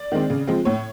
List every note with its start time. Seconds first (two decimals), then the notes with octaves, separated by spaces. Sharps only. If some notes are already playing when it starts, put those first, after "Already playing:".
Already playing: D5
0.12 D#3 G#3 C4
0.30 C#3
0.47 F3 G#3 C4
0.65 A2 C#5